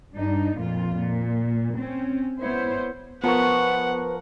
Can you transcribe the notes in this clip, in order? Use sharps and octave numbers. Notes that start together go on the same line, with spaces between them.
G2 D4 D#4
F2 A#2 F4
A#2
C4 C#4
B3 E4 C5 C#5
F3 B3 A#4 B4 F#5 C#6